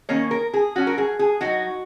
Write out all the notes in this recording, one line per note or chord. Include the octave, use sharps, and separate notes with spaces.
D#3 A#3 C#4 C#5
A#4
G#4
F#3 C#4 F#4
A#4
G#4
G#4
F#3 D#4 F#4